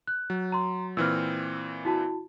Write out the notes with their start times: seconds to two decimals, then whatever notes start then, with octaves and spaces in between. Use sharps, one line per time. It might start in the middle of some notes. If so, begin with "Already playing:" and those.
0.07 F#6
0.30 F#3
0.52 A#5 C6
0.97 A#2 E3 C4 E6 F6
1.85 E4 F#4 A5